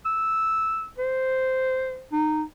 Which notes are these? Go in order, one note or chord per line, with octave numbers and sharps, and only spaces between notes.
E6
C5
D#4